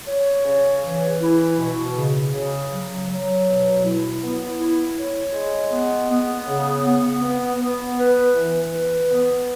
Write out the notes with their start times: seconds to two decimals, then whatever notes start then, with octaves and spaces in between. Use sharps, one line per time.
0.08 C#5
0.45 C#3
0.84 E3
1.22 E4
1.59 B2
1.97 C#3
2.33 C#3
2.72 F#3
3.09 F#3
3.47 B2
3.85 E4
4.22 B3
4.59 E4
4.97 C#5
5.34 G#3
5.71 B3
6.10 B3
6.47 C#3
6.84 B3
7.22 B3
7.60 B3
7.98 B4
8.35 E3
8.73 B4
9.10 B3